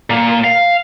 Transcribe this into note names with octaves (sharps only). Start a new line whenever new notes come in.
A#2 A#3
F5